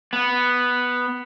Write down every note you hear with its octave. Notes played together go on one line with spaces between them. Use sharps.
B3